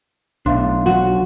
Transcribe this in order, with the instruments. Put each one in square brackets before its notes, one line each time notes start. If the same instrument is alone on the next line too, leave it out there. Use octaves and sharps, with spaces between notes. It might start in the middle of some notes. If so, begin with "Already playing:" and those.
[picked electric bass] B1 [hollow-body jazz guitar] A2 D4 [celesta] E5 F5 C6
[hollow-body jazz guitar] D3 F3 F#3 [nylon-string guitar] F#4